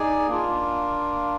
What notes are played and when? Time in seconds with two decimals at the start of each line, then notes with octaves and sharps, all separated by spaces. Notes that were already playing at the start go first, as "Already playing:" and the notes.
Already playing: D#4 G#4 D5 G#5
0.27 A#3 D4 F4